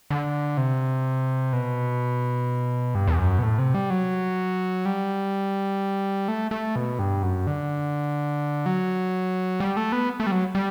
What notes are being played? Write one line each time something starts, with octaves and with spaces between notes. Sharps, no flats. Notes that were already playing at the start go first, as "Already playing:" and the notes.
D3
C3
B2
G2
E2
F#2
B2
A2
C3
G3
F#3
G3
A3
A3
B2
G2
F#2
D3
F#3
G3
A3
B3
A3
G3
F#3
G3